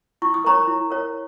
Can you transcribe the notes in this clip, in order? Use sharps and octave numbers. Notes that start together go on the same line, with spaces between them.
E4 C#6
D#6
A#4 C#5 A#5 C#6
E4
A#4 C#5